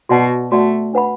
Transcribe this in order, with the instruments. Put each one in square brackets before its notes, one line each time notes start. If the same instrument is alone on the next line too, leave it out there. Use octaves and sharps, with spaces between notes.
[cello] B2 [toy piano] F#4 D5 F#5 A5
[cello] A3 [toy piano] F#4 D5 F#5 A5
[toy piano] D4 B4 F#5 B5